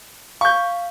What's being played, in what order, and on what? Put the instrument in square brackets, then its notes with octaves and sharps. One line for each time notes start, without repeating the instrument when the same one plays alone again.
[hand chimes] F5 [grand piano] C#6 G6